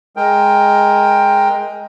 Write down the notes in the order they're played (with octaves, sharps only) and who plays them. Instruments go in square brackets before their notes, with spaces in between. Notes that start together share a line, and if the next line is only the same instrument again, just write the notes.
[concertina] G#3 A#4 G5